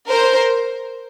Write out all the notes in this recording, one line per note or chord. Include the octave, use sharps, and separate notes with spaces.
A#4 C5